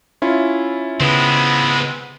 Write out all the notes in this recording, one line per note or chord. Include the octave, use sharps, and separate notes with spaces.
C#4 E4 F4
C#3 G#3 B3 C4